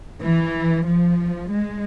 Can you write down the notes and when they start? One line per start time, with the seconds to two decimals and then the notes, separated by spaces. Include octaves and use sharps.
0.21 E3
0.86 F3
1.51 G#3